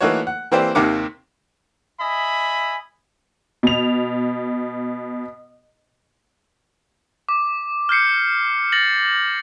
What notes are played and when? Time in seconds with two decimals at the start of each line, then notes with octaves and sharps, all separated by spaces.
0.01 E3 A3 A#3 D#4 F#4 C#5
0.27 F#5
0.52 E3 A#3 C4 G4 C5 D5
0.75 D#2 C3 D#3 A#3 F#5 D6
1.99 D#5 E5 G#5 B5
3.63 B2 F7
7.29 D6
7.89 F6 G6 C7 C#7
8.72 F6 A6 A#6 F#7